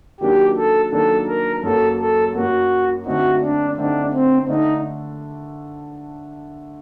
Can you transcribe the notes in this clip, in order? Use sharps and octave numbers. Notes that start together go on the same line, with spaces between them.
D#3 F#3 A#3 D4 G4
A4
D#3 F#3 A#3 D4 A4
A#4
F#2 F#3 A#3 A4
A4
F#2 F#3 A#3 F#4
D3 A3 C4 D#4 F#4
D4
D3 A3 C4 D4 D#4
C4
D3 A3 D4 D#4